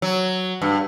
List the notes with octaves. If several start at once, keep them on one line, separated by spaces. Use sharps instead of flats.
F#3
G2